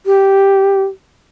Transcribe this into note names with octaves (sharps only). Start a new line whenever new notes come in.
G4